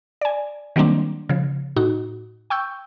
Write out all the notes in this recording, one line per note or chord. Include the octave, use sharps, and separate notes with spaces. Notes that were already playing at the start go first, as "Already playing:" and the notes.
D5 G#5
D#3 F#3 G3 A#3 C4 D4
C#3 F3
A2 D#4 F#4
G5 C#6 E6 G6